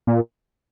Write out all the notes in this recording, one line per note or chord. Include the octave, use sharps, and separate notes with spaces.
A#2